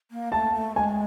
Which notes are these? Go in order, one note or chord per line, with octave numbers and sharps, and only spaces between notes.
A#3
A3 A5
A3
G#3 G#5